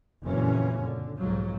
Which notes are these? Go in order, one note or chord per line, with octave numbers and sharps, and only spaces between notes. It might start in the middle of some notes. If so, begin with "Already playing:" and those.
F#1 F2 A#2 E3 C#4
D3
B1 G#2 F3 F#3